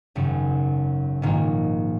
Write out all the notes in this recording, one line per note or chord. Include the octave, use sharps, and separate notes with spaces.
G#1 F#2 C#3
A#1 G#2 D#3 A#3 F4